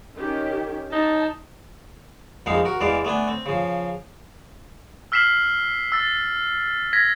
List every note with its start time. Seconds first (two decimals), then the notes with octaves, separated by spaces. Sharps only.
0.16 D#3 C#4 G4
0.92 D#4 A5
2.46 A#1 F2 F3 G#3 D#4 F5
2.65 F#4 A#4
2.80 E2 E3 G#3 D5 F5
3.05 A3 B3 D4 G#5
3.28 C4
3.46 C#3 F3
5.12 E6 F6 B6 C7 E7 F#7
5.92 E6 A6
6.93 G#6 A#6 B6